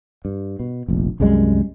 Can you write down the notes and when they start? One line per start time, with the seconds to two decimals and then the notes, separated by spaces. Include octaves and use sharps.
0.25 G2
0.60 B2
0.88 F1 A#1
1.20 C2 F#2 G3 G#3